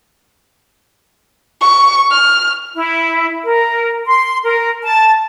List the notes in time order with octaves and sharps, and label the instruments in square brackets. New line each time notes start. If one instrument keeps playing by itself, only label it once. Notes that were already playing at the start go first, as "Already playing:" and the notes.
[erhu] C#6
F6
[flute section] E4
A#4
C6
A#4
A5